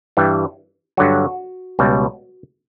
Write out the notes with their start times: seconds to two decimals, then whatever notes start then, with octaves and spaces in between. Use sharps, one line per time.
0.17 G2 E3 G3
0.97 G2 D3 F#3 F#4
1.79 C#2 B2 G3